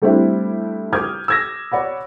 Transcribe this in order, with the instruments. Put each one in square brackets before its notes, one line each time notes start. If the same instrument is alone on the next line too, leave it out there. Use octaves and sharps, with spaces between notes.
[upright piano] G3 A3 C4 D4 E4 G4
D6 D#6 F6 G6 G#6
E6 G#6 A#6
C#5 D5 F#5 B5